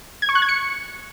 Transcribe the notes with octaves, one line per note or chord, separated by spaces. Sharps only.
G#6
C#6
F#6
G#6
C#7